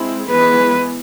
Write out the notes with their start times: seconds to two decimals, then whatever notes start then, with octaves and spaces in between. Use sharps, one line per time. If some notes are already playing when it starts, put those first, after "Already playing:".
Already playing: G#3 C4 E4
0.30 E3 G#3 B3 B4